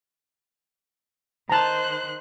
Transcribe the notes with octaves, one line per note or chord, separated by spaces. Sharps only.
D#3 C5 A5 A#5 F#6